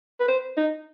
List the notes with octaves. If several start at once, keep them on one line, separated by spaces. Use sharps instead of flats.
B4
C5
D#4